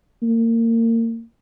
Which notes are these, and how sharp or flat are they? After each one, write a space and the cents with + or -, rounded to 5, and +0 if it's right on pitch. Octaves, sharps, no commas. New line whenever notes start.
A#3 -30